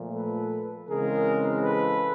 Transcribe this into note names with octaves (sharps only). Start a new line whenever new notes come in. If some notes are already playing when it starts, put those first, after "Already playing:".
Already playing: A#2 F3 A3
A4 B4
C#3 E3 G#3 C4 G#4 A#4
A4 B4